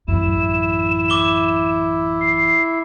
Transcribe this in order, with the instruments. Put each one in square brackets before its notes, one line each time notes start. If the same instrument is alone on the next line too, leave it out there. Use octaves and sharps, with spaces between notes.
[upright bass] A1 F#2 [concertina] E4 [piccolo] E7
[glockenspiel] D6 G7
[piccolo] C7